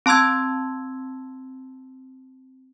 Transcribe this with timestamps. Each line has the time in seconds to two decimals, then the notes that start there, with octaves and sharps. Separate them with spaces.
0.06 C4 A5 C6 E6 G#6